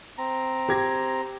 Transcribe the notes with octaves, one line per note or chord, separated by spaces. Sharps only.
C4 A#5
G4 G#6 A#6